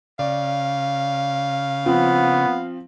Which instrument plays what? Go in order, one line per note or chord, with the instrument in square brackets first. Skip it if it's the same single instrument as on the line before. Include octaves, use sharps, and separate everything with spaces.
[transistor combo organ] C#3 [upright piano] D5 [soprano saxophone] F5
[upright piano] F3 C4 [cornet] B3